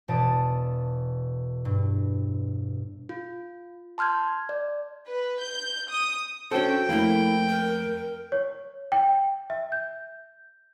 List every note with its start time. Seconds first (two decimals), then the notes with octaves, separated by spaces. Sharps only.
0.08 E1 B2 D5 A5 D#6
1.65 G2
3.09 F4
3.98 A5 C6 F6 G6 G#6
4.49 D5
5.06 B4
5.41 G6
5.90 D#6
6.51 C#4 D4 F#4 A4 C5 C#5 G5
6.89 F2 A3 A#3 E4
7.49 A#4
8.32 C#5
8.92 G5
9.50 E5
9.72 G6